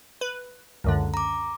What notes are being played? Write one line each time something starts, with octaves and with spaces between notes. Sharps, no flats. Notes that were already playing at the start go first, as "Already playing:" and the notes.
B4
C#2 F#2 D3
A#5 D6